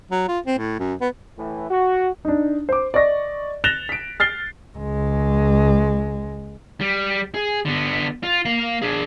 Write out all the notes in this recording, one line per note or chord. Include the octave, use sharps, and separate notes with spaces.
F#3
F4
C4
A2
F#2
B3
A2 E3
F#4
D4 D#4
C5 D6
D5 D#5 C#6 A#6
F#6 A6 A#6 E7 F7 G7
B6 D7
F6 A6 C7 G7
C#2 G#3
G3
G#4
D3 B3
F4
A#3 F5
D4 G#4